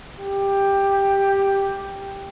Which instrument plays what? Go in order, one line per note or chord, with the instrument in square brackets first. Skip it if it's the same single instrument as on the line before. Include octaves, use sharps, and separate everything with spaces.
[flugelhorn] G4